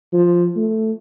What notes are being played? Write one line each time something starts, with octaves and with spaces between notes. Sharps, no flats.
F3
A3